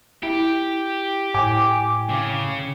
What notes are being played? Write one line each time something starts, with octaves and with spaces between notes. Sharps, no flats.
E4 G4
A2 G5 G#5 D6
C#3